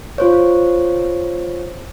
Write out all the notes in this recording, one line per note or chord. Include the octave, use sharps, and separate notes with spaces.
F4 C5 C#5